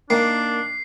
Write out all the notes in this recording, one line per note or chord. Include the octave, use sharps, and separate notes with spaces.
D#3 A#3 D4 C7